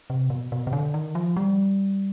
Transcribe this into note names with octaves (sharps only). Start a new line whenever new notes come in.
C3
B2
B2
C3
D3
D#3
F3
G3